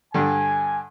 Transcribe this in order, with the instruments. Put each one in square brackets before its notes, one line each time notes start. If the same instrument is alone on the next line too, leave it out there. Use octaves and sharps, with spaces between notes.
[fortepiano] G2 D3 [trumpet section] G#5